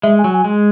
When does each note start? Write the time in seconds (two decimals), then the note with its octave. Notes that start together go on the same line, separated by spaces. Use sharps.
0.03 G#3 E5
0.19 G#5
0.24 F#3
0.34 G#5
0.45 G#3